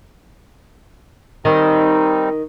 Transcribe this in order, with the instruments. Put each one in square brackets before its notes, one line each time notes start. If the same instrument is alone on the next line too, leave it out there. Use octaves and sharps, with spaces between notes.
[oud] D#3 [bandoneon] G3 C4 D#4